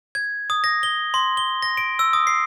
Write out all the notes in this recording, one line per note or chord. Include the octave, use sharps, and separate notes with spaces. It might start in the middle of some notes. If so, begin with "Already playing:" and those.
G#6
D#6
A#6
G7
C6
G7
A#6
D7
E6
D#6
C7